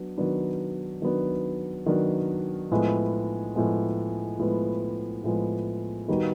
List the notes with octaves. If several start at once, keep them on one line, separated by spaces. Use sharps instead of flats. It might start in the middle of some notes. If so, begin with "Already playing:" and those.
Already playing: F#3 B3 D4
D#3 F#3 B3 D4
D#3 F#3 B3 D4
D#3 F#3 B3 D4
A2 F3 G#3 B3
A2 F3 G#3 B3
A2 F3 G#3 B3
A2 F3 G#3 B3
D#3 G3 B3 D#4 F#4